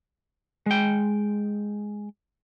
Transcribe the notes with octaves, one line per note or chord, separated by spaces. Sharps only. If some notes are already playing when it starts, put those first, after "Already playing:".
G#3 G5